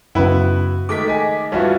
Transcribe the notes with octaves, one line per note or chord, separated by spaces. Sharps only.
F#2 C#3 B3 E4 F#4 B4 F#5
D#3 G#3 A3 D6 B6
D#5 G#5
G2 E3 C#4 F4 F#4 E5